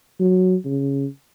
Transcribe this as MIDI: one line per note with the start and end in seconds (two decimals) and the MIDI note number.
0.20 0.56 54
0.65 1.06 49